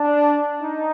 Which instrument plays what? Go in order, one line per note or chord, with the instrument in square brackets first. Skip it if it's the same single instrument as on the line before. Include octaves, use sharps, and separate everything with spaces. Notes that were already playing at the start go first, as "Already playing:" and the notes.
Already playing: [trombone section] D4
D#4